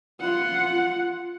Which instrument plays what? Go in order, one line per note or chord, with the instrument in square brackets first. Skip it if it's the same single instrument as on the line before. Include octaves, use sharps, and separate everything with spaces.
[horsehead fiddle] F4 F#5